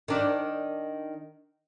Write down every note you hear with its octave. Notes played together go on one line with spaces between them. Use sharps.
D#3 D4